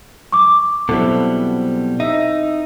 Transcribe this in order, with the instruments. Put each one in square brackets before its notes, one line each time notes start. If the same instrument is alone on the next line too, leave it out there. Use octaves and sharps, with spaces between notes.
[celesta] C#6 D6
[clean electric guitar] B2 F#3 G3 [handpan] C4 E4 A4
[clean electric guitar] D#4 [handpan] E5